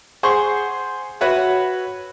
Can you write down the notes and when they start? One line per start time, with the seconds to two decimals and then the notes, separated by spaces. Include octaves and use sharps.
0.23 G#4 C5 F#5 C6 C#6
1.21 F#4 B4 C#5 E5 F#5